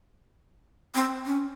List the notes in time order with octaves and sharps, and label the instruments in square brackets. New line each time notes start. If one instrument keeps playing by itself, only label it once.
[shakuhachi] C4
C#4